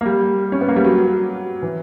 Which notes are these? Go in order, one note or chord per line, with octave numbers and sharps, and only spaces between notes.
A#3
G3
C#4
B3
A#3
G3
F#3
E3